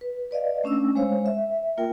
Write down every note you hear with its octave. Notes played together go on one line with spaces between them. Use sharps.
B4
B4 D5 D#5 F5
A3 C#4 D4 E6
G#3 C5 C#5 F5
E5
A#3 F4 A#4 G5